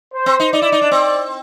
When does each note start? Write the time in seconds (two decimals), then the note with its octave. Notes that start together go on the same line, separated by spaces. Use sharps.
0.13 C5
0.26 C4
0.40 D#4
0.52 D#4 D5
0.62 E4
0.72 D#4
0.82 D4
0.92 C4